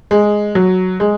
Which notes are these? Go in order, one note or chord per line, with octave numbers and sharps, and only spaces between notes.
G#3
F#3
G#3